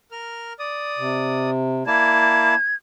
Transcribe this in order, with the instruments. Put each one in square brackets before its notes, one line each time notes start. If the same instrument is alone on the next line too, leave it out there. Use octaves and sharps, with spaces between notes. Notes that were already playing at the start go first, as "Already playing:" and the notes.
[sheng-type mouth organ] A#4 F6
D5 D#6
[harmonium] C3
[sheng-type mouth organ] A#3 E4 A5 [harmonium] D5 [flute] G#6